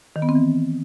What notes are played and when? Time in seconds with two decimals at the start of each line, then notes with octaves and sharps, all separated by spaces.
0.16 D#3
0.22 B3
0.29 C4
0.35 E3